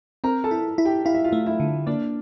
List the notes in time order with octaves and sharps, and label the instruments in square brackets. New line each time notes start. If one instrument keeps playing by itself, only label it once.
[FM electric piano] C4 [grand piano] A#4 A#5
[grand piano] A4 A5
[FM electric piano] E4
E4
[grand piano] G4 G5
[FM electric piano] E4 [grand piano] F5
[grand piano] E5
F4 F5
[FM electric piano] A3
[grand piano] E4 E5
[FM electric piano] D3
[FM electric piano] A#3 [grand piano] D4 D5